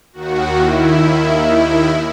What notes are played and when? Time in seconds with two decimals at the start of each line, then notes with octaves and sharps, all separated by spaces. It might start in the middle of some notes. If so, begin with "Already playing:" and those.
0.13 D#2 D#3 F#4
0.57 E4
1.45 E4